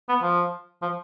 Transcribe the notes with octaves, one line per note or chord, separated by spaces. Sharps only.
B3
F3
F3